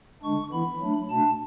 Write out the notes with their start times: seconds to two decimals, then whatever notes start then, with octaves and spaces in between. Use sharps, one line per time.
0.23 D3 G#3 D4 C#6
0.52 E3 B3 E4 B5
0.80 F#3 A3 D4
1.09 B2 A3 D4 A5